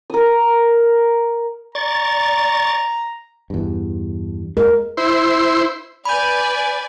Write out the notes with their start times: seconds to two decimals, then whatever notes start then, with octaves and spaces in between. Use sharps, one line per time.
0.10 A#4 D#6
1.75 D5 A#5 C#6 A6
3.50 E2 G2
4.57 G#3 A#4
4.97 E4 C5
6.05 B4 D5 G#5 B5 G6